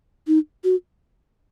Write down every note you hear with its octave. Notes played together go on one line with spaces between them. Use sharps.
D#4
F#4